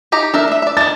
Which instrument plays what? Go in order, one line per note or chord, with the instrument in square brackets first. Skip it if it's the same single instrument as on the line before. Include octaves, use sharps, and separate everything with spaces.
[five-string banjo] D#4 G4 A#5
[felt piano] D4 [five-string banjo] A4 A#4 E5
[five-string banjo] A3 E5
D5 E5
[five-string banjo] D#3 G#3 D4 [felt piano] A6